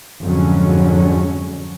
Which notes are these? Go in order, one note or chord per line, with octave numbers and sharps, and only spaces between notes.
F2 G#2 D3 F#3 G#3 C#4